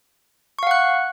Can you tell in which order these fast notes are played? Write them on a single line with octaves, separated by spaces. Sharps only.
C#6 F5 F#5 F#6